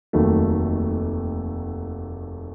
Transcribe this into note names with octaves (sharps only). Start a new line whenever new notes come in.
F1 D#2 D#3 F#3 A3